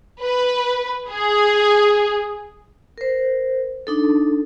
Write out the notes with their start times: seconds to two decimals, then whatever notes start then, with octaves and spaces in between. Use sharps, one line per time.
0.22 B4
1.09 G#4
2.98 A#4 C5
3.87 D4 D#4 A4